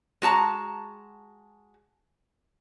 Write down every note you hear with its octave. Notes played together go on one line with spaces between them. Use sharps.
G#3 F#4 A5 A#5